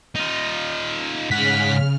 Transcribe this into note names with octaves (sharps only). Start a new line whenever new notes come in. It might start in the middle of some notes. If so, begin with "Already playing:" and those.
D#4 F4
G#2 C#3 F#5 F6 B6